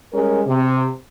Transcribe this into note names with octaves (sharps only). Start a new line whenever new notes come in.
G3 G#3 C#4 G#4 A#4
C3